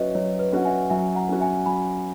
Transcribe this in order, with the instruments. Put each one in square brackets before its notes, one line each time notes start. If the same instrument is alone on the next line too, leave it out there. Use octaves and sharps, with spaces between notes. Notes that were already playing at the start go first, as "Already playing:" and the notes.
Already playing: [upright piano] F#3 C#4 F#4 [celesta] B4 C#5 D#5 E5
[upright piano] F#3 [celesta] C#5
[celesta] B4
[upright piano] C#4 F#4 [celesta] F#5
[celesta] E5 G#5
[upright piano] F#3 [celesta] E5 G#5
[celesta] F#5 A#5
[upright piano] C#4 F#4
[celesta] E5 G#5
[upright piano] F#3 [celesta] G#5 B5